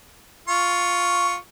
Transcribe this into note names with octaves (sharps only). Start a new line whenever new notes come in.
F4 C#6